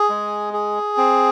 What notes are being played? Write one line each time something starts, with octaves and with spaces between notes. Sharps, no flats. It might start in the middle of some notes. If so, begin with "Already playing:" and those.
Already playing: G#4
G#3
G#4
C4